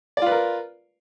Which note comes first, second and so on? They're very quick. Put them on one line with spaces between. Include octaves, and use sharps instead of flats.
D5 F4 B4 A#4